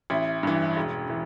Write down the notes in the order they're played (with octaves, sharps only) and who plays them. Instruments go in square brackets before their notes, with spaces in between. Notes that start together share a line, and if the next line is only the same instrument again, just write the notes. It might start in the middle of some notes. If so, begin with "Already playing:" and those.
[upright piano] A1 E4
G2 E3
E1
E3